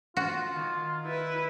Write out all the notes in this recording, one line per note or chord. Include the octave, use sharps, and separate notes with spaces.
F4 F#4
D#3
E4 B4